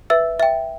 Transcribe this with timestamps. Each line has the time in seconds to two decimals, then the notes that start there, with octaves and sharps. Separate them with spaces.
0.10 B4 E5 E6
0.40 E5 G5